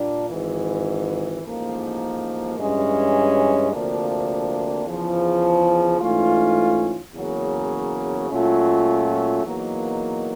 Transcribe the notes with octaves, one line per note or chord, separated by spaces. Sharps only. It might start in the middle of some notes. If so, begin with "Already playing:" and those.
Already playing: A#2 G3 A#3 D4
G#1 G#2 E3
A1 G#2 F3 A#3 D#4
G2 E3 G#3 C#4
D2 C3 F3 A#3 D4
E2 C#3 F3
G#2 E3 A3 C#4 F4
E2 C#3 F#3 A#3 C#4
A#2 F#3 A3 C#4 F4
E2 B2 F#3 A#3 D#4